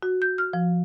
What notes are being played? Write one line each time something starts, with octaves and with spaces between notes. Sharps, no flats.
F#4
G6
F6
F3